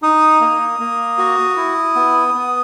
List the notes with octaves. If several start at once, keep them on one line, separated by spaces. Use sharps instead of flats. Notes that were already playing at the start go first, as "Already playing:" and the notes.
D#4 D#6
A#3
A#3
F#4
E4
B3
B3